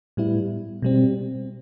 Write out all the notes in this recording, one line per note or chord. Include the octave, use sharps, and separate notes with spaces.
A2 G3 B3 E4
B2 G3 C4